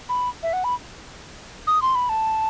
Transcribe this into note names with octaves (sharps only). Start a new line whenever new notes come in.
B5
E5
F#5
B5
D#6
C6
B5
A5